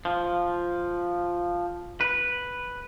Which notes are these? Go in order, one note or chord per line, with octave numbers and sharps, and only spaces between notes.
F3
B4